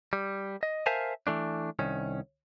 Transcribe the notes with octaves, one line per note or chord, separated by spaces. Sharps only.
G3
D#5
A#4 C5 E5 F5 G#5 A5
E3 A3 D4
C2 D#3 C#4